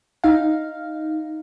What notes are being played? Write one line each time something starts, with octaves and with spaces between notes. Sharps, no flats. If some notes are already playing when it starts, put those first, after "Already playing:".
D#4 F5